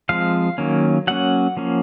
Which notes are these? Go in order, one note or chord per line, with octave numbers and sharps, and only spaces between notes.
F3 G#3 C4 F5
D#3 F#3 A#3 C#4
F#3 A#3 C#4 F#5
F3 A#3 C#4